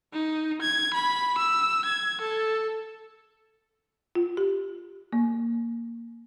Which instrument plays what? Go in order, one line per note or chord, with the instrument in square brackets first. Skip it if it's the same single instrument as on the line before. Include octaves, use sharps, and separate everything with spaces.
[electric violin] D#4
G#6
B5
E6
G#6
A4
[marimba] F4
G4
A#3